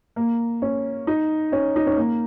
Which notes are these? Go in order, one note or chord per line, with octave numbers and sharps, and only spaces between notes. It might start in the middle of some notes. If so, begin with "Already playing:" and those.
A#3
C#4
D#4
C#4
D#4
C#4
A#3